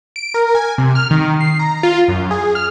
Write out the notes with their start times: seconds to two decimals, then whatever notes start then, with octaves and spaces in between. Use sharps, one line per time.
0.16 D7
0.34 A#4
0.55 G#5
0.78 C3
0.95 F6
1.11 D#3
1.41 C7
1.59 A#5
1.83 F4
2.08 F#2
2.31 G#4
2.55 F6